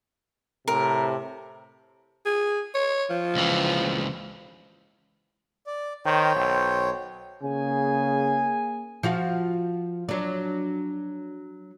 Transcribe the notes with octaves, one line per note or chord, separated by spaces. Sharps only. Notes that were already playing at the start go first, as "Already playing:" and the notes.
A2 C3 A#4
G#4
C#5
F3
C#2 E3
D5
D#3 C5 C#5 G5
B1
C#3 A#3 G#4 G#5
F3 F4 F#4
F#3 D4